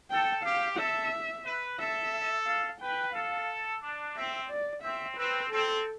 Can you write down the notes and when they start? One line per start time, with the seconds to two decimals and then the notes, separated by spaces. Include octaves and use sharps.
0.10 A4 G5
0.44 G4 F5
0.78 A4 E5
1.45 B4
1.79 A4 E5
2.46 F5
2.81 B4 G5
3.14 A4 F5
3.82 D4
4.15 C4 E5
4.50 D5
4.83 C4 E5
5.17 C4 B4
5.50 C4 A4